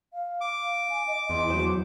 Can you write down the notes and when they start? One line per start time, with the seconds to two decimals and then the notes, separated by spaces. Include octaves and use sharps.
0.13 F5
0.41 D6
0.90 G#5
1.08 D#5
1.29 E2 C6
1.50 F#3 C5